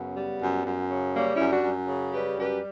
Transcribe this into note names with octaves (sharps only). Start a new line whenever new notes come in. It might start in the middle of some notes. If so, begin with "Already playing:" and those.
Already playing: F#2 C#3 B3
G3
F#2
F#2
C#3
G3 A#3 C#4
C#4 E4
F#2
D4 F#4
F#2
C#3
G3 G4 B4
F#2 G4 B4